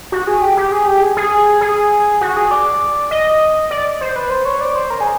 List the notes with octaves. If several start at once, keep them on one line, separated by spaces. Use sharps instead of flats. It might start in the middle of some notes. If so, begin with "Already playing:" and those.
F#4
G#4
G4
G4
G#4
G4
G#4
G#4
G#4
F#4
G#4
D5
D#5
D5
C5
B4
C5
C#5
D5
C5
A#4
G#4